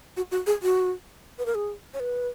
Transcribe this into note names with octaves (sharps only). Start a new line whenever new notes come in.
F#4
F#4
G#4
F#4
B4
A#4
G#4
C#5
B4